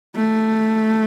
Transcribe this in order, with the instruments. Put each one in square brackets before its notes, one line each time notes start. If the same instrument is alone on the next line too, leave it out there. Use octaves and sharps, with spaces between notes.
[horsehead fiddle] A3